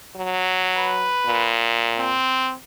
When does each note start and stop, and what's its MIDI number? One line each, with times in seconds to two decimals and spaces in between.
0.16 1.11 54
0.77 1.51 71
1.26 2.15 46
1.99 2.54 60